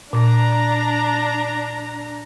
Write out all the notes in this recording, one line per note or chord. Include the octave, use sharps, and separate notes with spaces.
A#2 D4 A#5